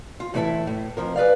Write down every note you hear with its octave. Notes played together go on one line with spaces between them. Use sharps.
F4
A2 E3 E4 C5 E5 A5
A2
F2 G#2 F3 A#4
G#4 B4 D5 F5